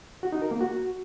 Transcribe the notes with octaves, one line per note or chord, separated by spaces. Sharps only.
F#4
D#4
A#4
A#3
F#4